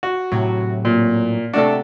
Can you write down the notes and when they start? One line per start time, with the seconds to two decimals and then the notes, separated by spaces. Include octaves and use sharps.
0.03 F#4
0.32 A2 C3 F#3
0.85 A#2
1.53 C3 A3 D4 F#4 A4